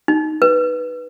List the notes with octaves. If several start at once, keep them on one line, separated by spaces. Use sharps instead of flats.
D#4
B4